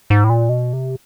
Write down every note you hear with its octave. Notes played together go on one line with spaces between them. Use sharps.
G#2
A2
A#2
B2
C3